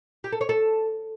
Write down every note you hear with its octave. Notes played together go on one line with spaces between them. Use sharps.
G4
A4
C#5
A4